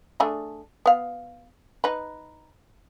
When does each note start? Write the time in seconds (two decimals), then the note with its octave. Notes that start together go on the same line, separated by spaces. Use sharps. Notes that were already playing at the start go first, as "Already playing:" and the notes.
0.20 A3 D4 G#4
0.86 B3 F5
1.84 D#4 B4